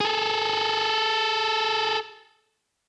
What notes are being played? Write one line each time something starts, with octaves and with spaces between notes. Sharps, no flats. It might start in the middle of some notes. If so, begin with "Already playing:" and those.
G#4 A4